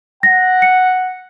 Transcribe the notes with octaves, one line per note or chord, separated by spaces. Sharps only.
F#5 A#6
C#7